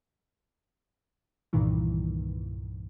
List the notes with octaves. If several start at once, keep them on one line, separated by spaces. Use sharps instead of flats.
C2 G2 A#2 D#3 E3